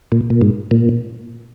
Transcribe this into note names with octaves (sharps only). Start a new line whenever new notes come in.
A#2
A#2
G#2
A#2